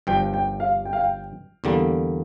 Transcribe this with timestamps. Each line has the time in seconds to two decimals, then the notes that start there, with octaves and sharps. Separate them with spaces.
0.07 G1 G2 F3 G5
0.34 G5
0.60 F5
0.85 G5
0.93 F5
1.00 G5
1.64 E2 D3 G3 A#3